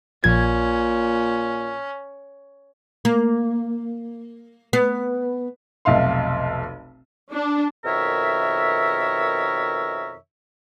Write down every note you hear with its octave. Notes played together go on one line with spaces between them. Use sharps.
A#1 A#2 C#4 G#6
A#3
B3
F1 B1 E5 F5 C6
D4
F2 B2 D#3 A#4 C#5 E5